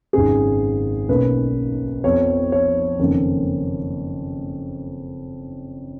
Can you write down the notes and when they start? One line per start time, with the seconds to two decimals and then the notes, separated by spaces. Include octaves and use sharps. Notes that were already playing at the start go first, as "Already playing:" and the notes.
0.13 G#1 F#2 C#3 G#4
1.09 B1 B2 A#3 C#4 B4
2.04 F2 F3 B3 C#5
2.52 C#5
2.99 F#1 F2 D#3 A#3 C#4